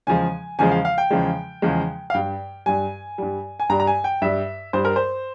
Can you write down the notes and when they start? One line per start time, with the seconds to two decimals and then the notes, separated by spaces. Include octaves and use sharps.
0.07 E2 C#3 F3 G#3 G#5
0.59 E2 C#3 F3 G#3 G#5
0.72 F5
0.85 F5
0.98 G5
1.10 E2 C#3 F3 G#3
1.62 E2 C#3 F3 G#3
2.10 F5
2.14 G2 G3 G5
2.66 G2 G3 G#5
3.18 G2 G3
3.60 G#5
3.70 G2 G3 A#5
3.80 A#5
3.87 G#5
4.04 G5
4.22 G2 G3 E5
4.73 G2 G3 C5
4.85 A#4
4.96 C5